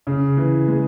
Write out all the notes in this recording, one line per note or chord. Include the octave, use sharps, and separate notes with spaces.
C#3
E3
G#3